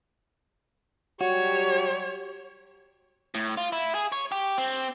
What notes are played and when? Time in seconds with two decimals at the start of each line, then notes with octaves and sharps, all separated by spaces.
1.21 F#3 G3 F#4 G4 C#5
3.35 A2
3.57 F4
3.72 E4
3.95 G#4
4.12 C#5
4.32 G4
4.58 C4